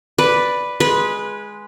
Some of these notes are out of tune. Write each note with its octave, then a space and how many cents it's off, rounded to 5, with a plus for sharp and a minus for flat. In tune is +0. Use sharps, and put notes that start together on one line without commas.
B4 +0 D5 +0
G#3 +0 B4 -15